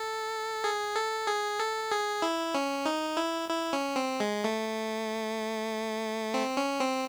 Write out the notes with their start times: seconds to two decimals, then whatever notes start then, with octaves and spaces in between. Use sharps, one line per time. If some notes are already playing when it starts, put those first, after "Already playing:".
Already playing: A4
0.64 G#4
0.96 A4
1.27 G#4
1.60 A4
1.92 G#4
2.22 E4
2.55 C#4
2.85 D#4
3.17 E4
3.49 E4
3.73 C#4
3.96 C4
4.20 G#3
4.44 A3
6.34 C4
6.57 C#4
6.80 C4